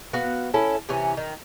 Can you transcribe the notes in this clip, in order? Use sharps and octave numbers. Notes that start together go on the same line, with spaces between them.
B3 F#4 F5
C#4 E4 A4
C3 E3 C#4
D#3